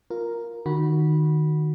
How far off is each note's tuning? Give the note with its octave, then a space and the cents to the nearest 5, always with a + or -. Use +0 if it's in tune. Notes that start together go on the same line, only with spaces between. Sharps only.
F4 +10 A#4 +0
D#3 -20 F#4 +0 B5 -15